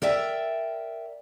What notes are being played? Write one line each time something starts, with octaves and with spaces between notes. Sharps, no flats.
A#4 D5 E5 G5